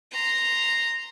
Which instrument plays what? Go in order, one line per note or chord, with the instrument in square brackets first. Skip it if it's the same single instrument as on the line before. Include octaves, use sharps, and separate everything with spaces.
[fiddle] A#5 C6